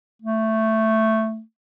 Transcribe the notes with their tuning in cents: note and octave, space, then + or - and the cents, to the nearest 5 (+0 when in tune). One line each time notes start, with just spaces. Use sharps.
A3 +5